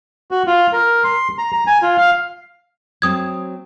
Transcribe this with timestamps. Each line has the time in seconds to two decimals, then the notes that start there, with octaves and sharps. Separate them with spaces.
0.31 F#4
0.47 F4
0.73 A#4
1.04 C6
1.38 A#5
1.53 A#5
1.67 G#5
1.82 F4
1.97 F5
3.02 F#3 A3 C4 D#6 G#6